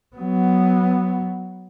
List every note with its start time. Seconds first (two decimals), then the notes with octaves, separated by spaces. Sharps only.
0.17 F#3 B3